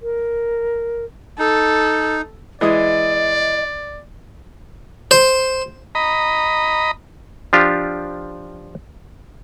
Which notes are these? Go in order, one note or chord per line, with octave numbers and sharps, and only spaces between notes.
A#4
D#4 A4
E3 G#3 D5 D#5 D#6
C5
D#5 A#5 B5
F3 D4 F4 G4